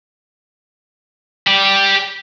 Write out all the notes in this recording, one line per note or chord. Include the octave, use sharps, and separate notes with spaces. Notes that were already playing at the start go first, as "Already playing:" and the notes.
G4 D5